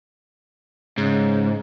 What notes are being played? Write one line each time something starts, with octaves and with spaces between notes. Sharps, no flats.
G#2 C#3